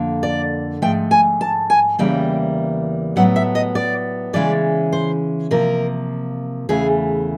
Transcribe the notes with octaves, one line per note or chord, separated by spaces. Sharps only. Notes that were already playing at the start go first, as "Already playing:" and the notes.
Already playing: F2 D3 A#3
D5
G#2 F3 A3 G5
G#5
A5
G#5
E2 C#3 E3 G3 A#3 G5
A2 F#3 B3 F#5
E5
D#5
D5
C#3 E3 G#3 C#4 D5
C5
C3 F3 A#3 A#4
E2 C#3 E3 A3 G#4